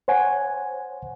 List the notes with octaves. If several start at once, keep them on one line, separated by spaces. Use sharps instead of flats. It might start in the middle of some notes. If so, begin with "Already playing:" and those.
C5 C#5 F#5 G#5